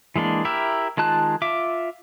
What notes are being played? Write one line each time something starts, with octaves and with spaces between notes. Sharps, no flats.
E3 G#3 A#3 D4
E4 G4 A#4 E5
D#3 G#3 F4 A5 F#6
F4 E5 D6